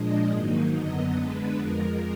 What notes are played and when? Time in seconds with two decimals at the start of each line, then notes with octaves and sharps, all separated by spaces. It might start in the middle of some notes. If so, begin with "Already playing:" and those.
Already playing: A#2 F3 G#3 D4 D#5
0.31 G#2 D#3 F#3 A#3 D#4
0.73 F#2 D3 F#3 B3 D#5
1.15 D3 G#3 B3 D4 B4
1.57 F2 F3 G#3 A#4